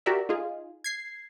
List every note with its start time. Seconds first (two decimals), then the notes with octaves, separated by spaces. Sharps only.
0.06 F#4 G4 A#4 D5 E5
0.29 D#4 F4 G#4
0.84 G#6 C7